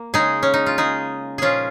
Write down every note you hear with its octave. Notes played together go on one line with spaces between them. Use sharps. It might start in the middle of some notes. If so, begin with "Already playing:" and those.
Already playing: A#3
C#3 G#3 D#4 G#4
C#4
D#4
F4
D#4 G#4
A#2 F3 G#3 C#4 F4 G#4